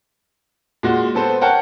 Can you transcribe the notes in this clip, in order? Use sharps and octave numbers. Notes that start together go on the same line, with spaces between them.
A#2 G#3 F#4
B3 C4 A4 B4 C5
A#4 C#5 F#5 G5 A5